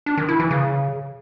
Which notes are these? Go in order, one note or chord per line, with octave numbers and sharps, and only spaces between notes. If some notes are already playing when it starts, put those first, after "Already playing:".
D4
D#3
E4
E3
C#3